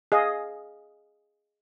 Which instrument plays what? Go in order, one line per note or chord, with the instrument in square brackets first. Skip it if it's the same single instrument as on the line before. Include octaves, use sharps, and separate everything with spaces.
[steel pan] G#4 D#5 F5